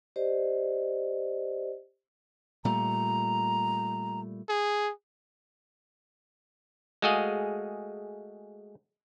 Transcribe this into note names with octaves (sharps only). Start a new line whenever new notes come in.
G4 C5 D5 D#5
A#2 G3 A3 A#5
G#4
G#3 A3 F#4 G#4 D#5 F5